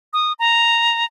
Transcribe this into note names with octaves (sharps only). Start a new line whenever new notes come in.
D#6
A#5